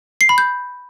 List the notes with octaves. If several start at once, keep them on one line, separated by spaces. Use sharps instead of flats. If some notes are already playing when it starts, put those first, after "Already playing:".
C7
B5
G6